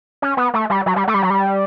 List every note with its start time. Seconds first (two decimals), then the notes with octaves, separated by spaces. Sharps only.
0.22 C#4
0.37 B3
0.54 A3
0.70 G3
0.86 F#3
0.96 G3
1.08 A3
1.14 G3
1.23 F#3
1.30 G3